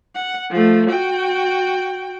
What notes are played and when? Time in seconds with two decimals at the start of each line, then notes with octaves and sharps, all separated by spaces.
0.15 F#5
0.50 F3 A3
0.90 F#4 G5